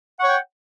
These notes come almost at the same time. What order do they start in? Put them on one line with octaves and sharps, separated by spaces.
F#5 C#6 C#5 G5